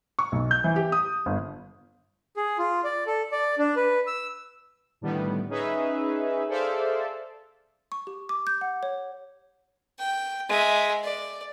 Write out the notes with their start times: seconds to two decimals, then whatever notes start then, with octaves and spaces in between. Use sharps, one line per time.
0.19 C#6
0.32 B1
0.51 G6
0.64 E3
0.76 G4
0.92 D#6
1.26 G1
2.37 G#4
2.58 F4
2.84 D5
3.07 A4
3.32 D5
3.58 D4
3.76 B4
4.07 E6
5.01 A2 D3 D#3 G3 B3
5.49 C#4 D#4 G#4 B4 E5
6.49 G#4 A4 C5 D5 E5 F5
7.92 C#6
8.07 G4
8.29 D6
8.47 G6
8.61 F#5
8.83 C#5
9.99 G5
10.49 G#3 E5
11.03 D5